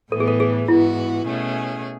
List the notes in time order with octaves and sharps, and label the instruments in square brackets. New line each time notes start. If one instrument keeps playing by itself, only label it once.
[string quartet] A2 E3 B3 [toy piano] A4
[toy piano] G#4
A4
G#4
[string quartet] G#2 E3 B3 F#4 [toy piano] E4
[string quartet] B2 A3 C#4 G#4